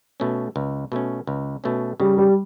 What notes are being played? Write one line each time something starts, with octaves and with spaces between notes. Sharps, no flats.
B2 A3 C#4
C#2
B2 A3 C#4
C#2
B2 A3 C#4
C#3 G3
G3